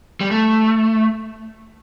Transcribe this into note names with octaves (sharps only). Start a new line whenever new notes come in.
G3
A3